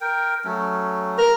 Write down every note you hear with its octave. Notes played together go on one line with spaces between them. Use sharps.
A#4 G5
F#3 A3 C#4
A#4